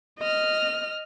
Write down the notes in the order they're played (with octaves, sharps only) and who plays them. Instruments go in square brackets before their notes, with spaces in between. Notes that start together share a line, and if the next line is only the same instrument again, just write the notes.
[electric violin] D#5 F6